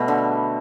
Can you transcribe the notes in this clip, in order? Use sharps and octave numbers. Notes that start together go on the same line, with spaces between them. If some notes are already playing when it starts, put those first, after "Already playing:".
Already playing: B2 G3 A3
D3